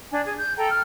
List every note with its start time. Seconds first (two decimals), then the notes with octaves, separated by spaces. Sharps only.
0.12 D4 G#5
0.25 G#4
0.38 G6
0.56 A4 G5 A#5
0.71 F6